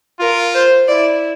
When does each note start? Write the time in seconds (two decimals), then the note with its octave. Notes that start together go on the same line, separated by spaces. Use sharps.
0.20 F4 A#4
0.54 C5
0.88 E4 D5